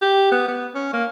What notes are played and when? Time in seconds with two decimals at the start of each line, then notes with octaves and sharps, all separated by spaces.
0.02 G4
0.32 B3
0.48 B3
0.75 C#4
0.93 A#3